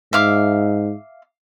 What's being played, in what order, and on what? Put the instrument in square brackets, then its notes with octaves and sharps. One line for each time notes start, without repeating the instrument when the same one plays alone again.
[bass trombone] G#2 [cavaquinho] E5 F5 D6